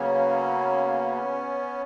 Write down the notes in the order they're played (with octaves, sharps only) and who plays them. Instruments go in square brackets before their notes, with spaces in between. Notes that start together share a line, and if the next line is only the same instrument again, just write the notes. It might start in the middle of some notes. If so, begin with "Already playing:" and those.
Already playing: [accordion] C#3 F#3 A#3 B3 C#4